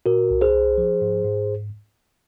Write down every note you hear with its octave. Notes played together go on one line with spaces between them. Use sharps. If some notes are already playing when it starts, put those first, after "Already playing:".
A#2 F#4 A#4
C2
G#4 C5
C2
F3
G#2
G#2